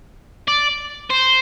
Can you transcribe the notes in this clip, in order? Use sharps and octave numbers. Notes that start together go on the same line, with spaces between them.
D5
C5